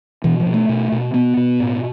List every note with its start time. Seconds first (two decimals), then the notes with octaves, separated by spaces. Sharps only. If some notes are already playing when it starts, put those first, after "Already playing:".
0.24 B2 E3
0.40 F3
0.46 B2
0.54 A3
0.69 B2
0.92 B2
1.14 B2 B3
1.37 B2
1.60 A2